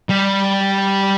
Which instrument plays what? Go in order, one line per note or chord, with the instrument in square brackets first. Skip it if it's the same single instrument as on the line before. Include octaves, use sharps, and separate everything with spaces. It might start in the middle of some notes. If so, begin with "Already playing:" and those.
[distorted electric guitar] G3